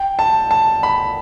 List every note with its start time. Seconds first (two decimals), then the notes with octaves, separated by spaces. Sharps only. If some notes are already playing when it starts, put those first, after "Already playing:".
Already playing: G5
0.19 A5
0.51 A5
0.83 B5